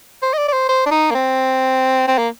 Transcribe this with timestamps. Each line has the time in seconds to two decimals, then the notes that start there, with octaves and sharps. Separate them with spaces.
0.22 C5
0.33 D#5
0.38 D5
0.48 D5
0.53 C5
0.69 C5
0.86 D4
0.91 D#4
1.11 A#3
1.15 C4
2.08 C4
2.18 A#3